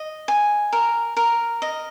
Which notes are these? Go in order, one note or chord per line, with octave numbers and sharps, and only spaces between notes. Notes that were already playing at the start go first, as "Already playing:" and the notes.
Already playing: D#5
G#5
A#4
A#4
D#5